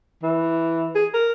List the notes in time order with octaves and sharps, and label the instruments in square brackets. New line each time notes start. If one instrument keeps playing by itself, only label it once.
[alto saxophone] E3
G#4
A#4